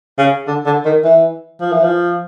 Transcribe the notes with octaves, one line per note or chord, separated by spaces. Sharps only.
C#3
D3
D3
D#3
E3
F3
E3
F3